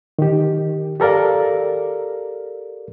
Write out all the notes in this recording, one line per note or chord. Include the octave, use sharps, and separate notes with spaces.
D#3 G4
G4 A4 A#4 D5 F5